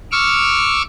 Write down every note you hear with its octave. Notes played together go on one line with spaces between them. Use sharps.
C#6 D6 E6 F6